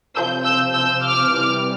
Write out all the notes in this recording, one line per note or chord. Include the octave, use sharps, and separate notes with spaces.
C3 F3 E6 G6
E6 G6
E6 G6
D6 F6
C3 E3 G3